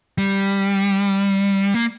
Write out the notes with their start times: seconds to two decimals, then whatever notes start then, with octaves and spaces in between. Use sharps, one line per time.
0.18 G3
1.74 A#3